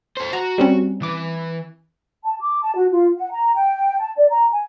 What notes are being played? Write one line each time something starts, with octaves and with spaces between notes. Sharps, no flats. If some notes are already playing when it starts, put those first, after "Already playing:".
A4 C5
F#4 A#5
G3 C4 C#4
E3 D6
A5
D6
A5
F#4
F4
F#5
A#5
G5
A5
D5
A#5
G#5